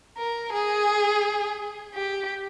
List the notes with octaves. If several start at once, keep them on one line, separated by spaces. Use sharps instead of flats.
A#4
G#4
G4